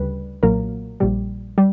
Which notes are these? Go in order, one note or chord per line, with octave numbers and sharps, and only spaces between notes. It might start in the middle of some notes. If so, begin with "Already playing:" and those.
Already playing: D2 C#3 G3 B4
B1 A#2 F#3 A#3 A#4
A#1 A#2 G3
G3